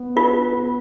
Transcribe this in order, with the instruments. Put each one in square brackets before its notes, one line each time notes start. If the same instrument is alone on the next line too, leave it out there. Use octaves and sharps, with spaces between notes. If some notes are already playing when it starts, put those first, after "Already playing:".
Already playing: [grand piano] B3
[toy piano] F4 [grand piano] B4
[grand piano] B3